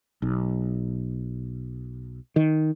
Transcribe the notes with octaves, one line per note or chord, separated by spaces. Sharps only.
B1
D#3